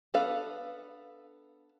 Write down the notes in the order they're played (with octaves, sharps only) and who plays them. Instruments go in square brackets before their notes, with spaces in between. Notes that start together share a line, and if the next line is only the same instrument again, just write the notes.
[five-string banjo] B3 D4 A4 B4 F5